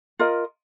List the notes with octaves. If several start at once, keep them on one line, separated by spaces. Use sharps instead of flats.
F4 A#4 D#5